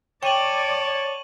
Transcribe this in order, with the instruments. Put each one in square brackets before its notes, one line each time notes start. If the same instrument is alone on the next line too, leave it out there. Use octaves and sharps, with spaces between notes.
[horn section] C#5 A5 [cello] D5 [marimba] G5 [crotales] C#6 D#7 F#7